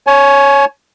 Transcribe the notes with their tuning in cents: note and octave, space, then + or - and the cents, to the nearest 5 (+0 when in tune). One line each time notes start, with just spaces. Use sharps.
C#5 +0 G#5 +35